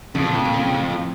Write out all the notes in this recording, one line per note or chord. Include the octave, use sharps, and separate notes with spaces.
F2 C#3
A#2
A2
A#2
C#3
A2